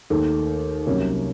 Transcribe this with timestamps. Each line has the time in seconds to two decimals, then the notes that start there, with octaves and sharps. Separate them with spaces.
0.10 D#2 D#3 A3
0.86 C2 C3 F#3 A#3 C#4